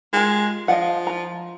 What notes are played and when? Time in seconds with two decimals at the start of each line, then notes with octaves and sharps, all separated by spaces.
0.13 G#3 F4 G4 A#4
0.68 F3 D#5 F5 F#5
1.07 F4 A#5